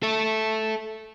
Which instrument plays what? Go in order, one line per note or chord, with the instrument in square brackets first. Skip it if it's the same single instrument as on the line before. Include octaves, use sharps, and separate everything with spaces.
[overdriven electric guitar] A4 E5